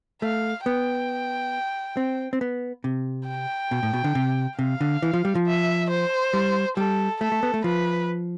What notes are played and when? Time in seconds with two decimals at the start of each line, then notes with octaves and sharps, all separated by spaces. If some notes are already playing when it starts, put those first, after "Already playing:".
0.22 A3 F5
0.65 B3 G5
1.97 C4
2.33 C4
2.41 B3
2.84 C3
3.27 G5
3.71 B2
3.83 A2
3.93 B2
4.04 D3
4.15 C3
4.58 C3 F5
4.81 D3
5.02 E3
5.13 F3
5.25 G3
5.35 F3
5.46 E5
5.90 C5
6.33 G3
6.77 G3 A4
7.21 A3 A4
7.32 A3
7.43 B3
7.54 A3
7.64 F3 B4